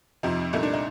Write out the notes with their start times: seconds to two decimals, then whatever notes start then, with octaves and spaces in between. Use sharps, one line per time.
0.23 F2 C3 F3 D#4
0.53 C2 A#2 A3 D#4
0.63 D4
0.74 D#4